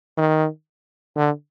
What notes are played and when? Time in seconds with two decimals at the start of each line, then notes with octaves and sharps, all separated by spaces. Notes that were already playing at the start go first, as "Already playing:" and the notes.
0.17 D#3
1.15 D3